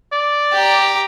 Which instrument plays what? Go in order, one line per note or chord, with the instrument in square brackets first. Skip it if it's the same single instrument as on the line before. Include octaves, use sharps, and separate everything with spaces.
[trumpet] D5
[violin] G4 A#5